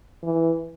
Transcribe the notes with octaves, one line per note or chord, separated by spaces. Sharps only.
E3